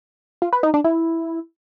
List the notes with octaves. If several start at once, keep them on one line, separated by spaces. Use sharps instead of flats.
F4
B4
D#4
D4
E4